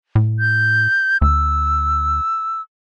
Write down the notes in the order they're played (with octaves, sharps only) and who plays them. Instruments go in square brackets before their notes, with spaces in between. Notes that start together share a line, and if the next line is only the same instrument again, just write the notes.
[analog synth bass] A2
[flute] G6
[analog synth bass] D2 [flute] E6